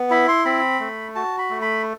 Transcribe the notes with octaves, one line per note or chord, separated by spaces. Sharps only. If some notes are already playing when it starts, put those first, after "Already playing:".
Already playing: B3
E4 B5
C6
C4 B5
A3
F#4 A5
B5
A3
B5